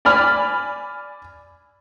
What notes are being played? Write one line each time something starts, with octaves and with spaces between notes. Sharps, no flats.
D5 G#5 B5 F6